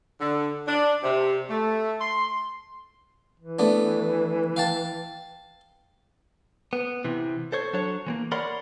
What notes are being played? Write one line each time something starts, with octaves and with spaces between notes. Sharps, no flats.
D3
D4
C3
A3
C6
E3
A3 B3 D4
F5 G5 A5
B3
C3 E3
A4 C5 C#5
F#3 D4 A4 C#5
E3 G#3 A#3
A#4 C#5 D5 F#5 B5 C6